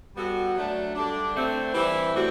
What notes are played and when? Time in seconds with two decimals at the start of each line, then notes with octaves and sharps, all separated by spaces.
0.14 G3 B3 F#4 A4
0.55 F#3 A3 D4
0.95 D3 G3 D4
1.35 D3 A3 C4
1.74 E3 G3 C4 E4
2.14 A2 G3 C4 F#4